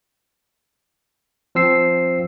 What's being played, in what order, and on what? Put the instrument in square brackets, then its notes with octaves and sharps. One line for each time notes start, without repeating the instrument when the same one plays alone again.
[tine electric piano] F3 C4 E6 C7